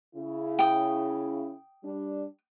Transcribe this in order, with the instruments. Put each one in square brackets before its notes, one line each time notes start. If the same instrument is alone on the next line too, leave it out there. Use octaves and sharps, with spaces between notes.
[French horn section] C#3 E4
[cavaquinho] G5 D#6
[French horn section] G3 D4